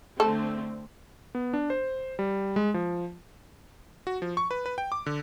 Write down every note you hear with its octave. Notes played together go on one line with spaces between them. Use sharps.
D3 A3 C4 A4
B3
D4
C5
G3
G#3
F3
F#4
F3
C#6
B4
B4
G5
D6
D3